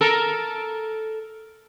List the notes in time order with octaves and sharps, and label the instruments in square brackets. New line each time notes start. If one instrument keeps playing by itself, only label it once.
[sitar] A4 A#4